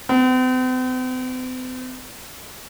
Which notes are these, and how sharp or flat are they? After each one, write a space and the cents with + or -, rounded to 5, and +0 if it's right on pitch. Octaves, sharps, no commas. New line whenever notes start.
C4 -45